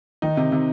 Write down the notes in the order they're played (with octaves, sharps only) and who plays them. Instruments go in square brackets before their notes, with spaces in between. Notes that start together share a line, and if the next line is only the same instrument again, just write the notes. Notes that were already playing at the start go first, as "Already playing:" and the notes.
[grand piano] D#3 [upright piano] D#4
[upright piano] C3
C3